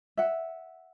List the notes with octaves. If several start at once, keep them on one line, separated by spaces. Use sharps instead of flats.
E5 F#5